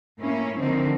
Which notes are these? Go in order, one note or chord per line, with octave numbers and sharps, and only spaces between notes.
A2 A#3 C#4 E4
D3 D#3 F3 C4 D#4